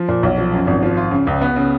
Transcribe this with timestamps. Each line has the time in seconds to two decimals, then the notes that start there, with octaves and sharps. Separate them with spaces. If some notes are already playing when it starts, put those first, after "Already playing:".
Already playing: F3
0.09 A#2
0.23 B1
0.38 F3
0.53 F#2
0.67 G#1
0.83 F3
0.97 F4
1.11 C#3
1.27 C#2
1.41 B3
1.56 C#3